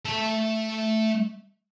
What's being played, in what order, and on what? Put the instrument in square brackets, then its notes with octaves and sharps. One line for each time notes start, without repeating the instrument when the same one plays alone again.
[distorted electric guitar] A3 A5